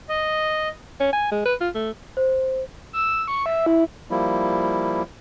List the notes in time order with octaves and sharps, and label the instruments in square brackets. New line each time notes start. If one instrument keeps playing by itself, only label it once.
[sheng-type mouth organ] D#5
[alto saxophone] C#4
G#5
G#3
B4
F4
A3
[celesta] C5
[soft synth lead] E6
C#6
E5
E4
[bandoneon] F3 G3 A#3 E4